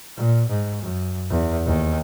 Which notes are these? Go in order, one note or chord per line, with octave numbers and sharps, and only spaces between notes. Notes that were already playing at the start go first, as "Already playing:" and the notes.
A#2
G#2
F#2
E2
D#2